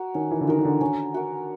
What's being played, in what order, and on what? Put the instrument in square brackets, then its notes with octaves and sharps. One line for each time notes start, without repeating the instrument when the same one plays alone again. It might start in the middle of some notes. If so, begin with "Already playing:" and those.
Already playing: [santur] F#4 A#4
[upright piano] D#3 [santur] C#4
[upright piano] E3
D3
[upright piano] D#3 [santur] F#4 A#4
[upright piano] D#3
D3
[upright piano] D3 [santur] C#4
[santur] F#4 A#4